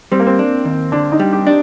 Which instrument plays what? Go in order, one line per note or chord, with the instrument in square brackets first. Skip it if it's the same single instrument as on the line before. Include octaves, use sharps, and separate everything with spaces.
[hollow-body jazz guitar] G3 [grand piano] C4
[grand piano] A#3
C4
[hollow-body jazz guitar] D4
D#2
[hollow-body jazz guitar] D3 [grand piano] D4
[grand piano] D#4
[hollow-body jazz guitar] G3
[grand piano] G4
[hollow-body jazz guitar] D4